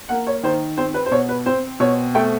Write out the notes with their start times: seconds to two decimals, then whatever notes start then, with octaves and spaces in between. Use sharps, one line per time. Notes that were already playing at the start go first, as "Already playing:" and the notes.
0.09 A#3 F#5
0.27 C#5
0.43 D#3 C5
0.77 C4 C5
0.94 B4
1.06 C5
1.11 B2 C#5
1.29 B4
1.46 C4 C5
1.80 B2 C#5
2.15 A3 G5